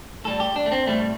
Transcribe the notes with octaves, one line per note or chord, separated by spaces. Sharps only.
A2 G3 A4
G4
D4
A3
C4
A2 G3 A3